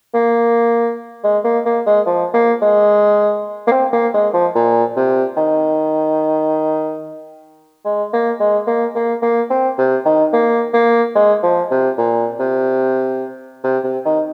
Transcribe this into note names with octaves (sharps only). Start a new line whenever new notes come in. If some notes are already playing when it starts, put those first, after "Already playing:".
A#3
G#3
A#3
A#3
G#3
F3
A#3
G#3
A#3
C4
A#3
G#3
F3
A#2
C3
D#3
G#3
A#3
G#3
A#3
A#3
A#3
C4
C3
D#3
A#3
A#3
G#3
F3
C3
A#2
C3
C3
C3
D#3